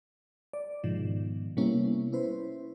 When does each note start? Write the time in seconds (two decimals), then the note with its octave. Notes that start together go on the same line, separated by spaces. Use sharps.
0.53 D5
0.84 G#2 B2 D#3 F3
1.57 C3 G3 A#3 B3 C#4 E4
2.12 C#4 E4 B4 C5